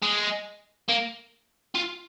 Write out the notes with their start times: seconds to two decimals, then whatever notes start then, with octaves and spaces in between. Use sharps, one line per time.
0.02 G#3
0.89 A#3
1.75 F4